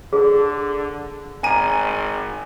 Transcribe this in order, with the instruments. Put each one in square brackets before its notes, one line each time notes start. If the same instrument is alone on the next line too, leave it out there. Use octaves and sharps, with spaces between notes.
[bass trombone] D3 [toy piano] G#4
[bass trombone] G#1 [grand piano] G#5 A#5 D#7